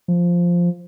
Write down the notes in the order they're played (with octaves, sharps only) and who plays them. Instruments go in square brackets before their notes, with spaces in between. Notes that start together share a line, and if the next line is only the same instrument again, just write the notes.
[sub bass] F3